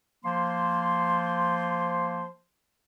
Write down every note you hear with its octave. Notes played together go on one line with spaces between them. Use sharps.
F3 A#3 C5 C6